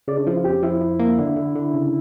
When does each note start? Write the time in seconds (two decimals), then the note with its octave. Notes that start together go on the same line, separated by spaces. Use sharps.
0.08 C#3 D5
0.18 D4
0.26 F3 E4
0.36 F4
0.44 F2 G4
0.63 F3 E4
0.81 F3
0.99 A#3
1.18 D3
1.36 D3
1.55 D3
1.74 C#3